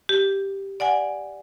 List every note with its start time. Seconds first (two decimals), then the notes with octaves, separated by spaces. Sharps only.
0.09 G4
0.80 D5 F#5 G#5